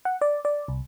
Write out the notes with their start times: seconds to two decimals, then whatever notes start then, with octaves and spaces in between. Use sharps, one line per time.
0.05 F#5
0.21 D5
0.45 D5
0.68 C2